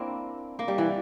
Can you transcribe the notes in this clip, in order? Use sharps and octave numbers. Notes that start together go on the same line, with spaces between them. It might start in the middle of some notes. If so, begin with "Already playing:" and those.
Already playing: A#3 C4 D4 E4
A#3
G3
E3